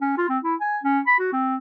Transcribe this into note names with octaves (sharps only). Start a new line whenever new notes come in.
C#4
F4
C4
E4
G#5
C#4
B5
F#4
C4